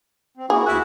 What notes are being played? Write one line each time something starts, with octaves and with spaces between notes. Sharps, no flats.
C4
A#3 E4 F#4 G#4
D2 E4 F#4 G#5